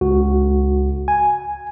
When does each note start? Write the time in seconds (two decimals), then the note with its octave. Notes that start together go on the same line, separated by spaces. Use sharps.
0.01 C#2 F#4
1.08 G#5